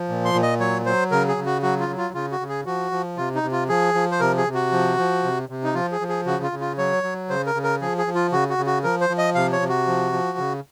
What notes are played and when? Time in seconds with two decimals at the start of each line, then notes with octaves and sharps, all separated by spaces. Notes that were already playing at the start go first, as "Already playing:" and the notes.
Already playing: F3
0.09 A#2
0.25 C6
0.34 A#2
0.42 D#5
0.60 F#3 C#5
0.86 F#3 C5
1.11 C#3 A#4
1.28 G#4
1.37 C#3
1.46 F#4
1.62 F#3 F#4
1.80 F4
1.89 F#3
1.98 F4
2.14 C#3 F4
2.32 F#4
2.40 C#3
2.49 G#4
2.66 F3 F#4
2.92 F3
3.17 C3 F4
3.35 D#4
3.43 C3
3.52 F4
3.69 F3 G#4
3.94 F3
4.11 C5
4.20 C3 A#4
4.37 G#4
4.46 C3
4.54 F#4
4.72 F3
4.98 F3
5.24 C3
5.49 C3
5.64 D#4
5.74 F3 F4
5.92 G#4
6.00 F3
6.09 G#4
6.26 C#3 F#4
6.43 F4
6.52 C#3
6.61 F4
6.78 F#3 C#5
7.03 F#3
7.29 C#3 C5
7.46 A#4
7.55 C#3
7.64 A#4
7.81 F3 G#4
7.98 G#4
8.06 F3
8.15 F4
8.32 C#3 F#4
8.50 F#4
8.58 C#3
8.67 F#4
8.83 F3 A#4
9.01 C5
9.09 F3
9.18 D#5
9.35 C3 F5
9.52 C#5
9.61 C3
9.69 F#4
9.87 F3
10.12 F3
10.38 C#3